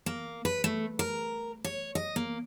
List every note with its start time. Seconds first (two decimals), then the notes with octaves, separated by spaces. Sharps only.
0.06 A#3
0.45 B4
0.64 A3
0.99 A#4
1.64 C#5
1.95 D#5
2.16 A#3